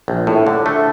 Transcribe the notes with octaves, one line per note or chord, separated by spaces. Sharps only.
A#1
A2
D3
A3